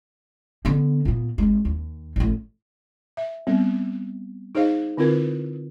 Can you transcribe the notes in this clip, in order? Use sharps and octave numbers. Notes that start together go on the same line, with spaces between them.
D3 B3
A#2 B3
G#1 G#3
D#2
A1 A2
E5
G3 B3 C4
D#4 G#4 C5 D#5 F5
D3 C4 E4 F4 A#4 B4